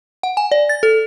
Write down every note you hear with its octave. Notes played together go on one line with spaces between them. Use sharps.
F#5
G#5
D5
A6
A4